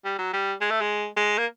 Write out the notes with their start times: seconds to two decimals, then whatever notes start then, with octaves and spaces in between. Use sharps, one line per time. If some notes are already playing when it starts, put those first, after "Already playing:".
0.05 G3
0.19 F#3
0.33 G3
0.61 G#3
0.70 A3
0.81 G#3
1.17 G#3
1.38 A#3